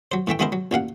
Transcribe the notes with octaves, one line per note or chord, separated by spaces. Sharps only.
F#3 C5
A2 E3 A3 G5
E3 G#3 B3 E4 A#4 C5
F#3
A1 A#2 F5 F#5